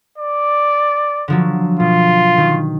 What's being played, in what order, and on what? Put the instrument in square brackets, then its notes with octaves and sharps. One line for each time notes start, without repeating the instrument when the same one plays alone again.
[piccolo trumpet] D5
[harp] D3 F3 F#3
[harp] B2 [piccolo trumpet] F4
[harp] D#3